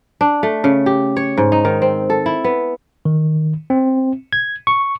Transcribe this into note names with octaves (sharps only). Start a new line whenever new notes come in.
D4
A3
C#3
G4
C#5
G#2
D#4
D#3
C4
A4
E4
B3
D#3
C4
G#6
C#6